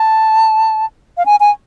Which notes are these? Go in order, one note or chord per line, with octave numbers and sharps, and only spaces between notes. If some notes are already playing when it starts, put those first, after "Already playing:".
Already playing: A5
F5
G#5
G#5